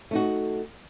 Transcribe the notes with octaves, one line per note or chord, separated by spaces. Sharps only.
A3 D#4 F#4